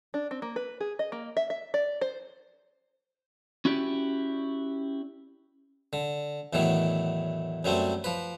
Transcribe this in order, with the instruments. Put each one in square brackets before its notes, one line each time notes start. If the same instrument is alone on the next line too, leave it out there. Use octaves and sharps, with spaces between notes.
[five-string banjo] D4
C4
A#3
B4
G#4
D#5
A#3
E5
E5
D5
C5
[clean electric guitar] C#4 E4 F#4 G4 D5
[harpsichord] D3
E2 A2 D#3 E3 F#3
F#2 F#3 G3 A3 C4
F3 B4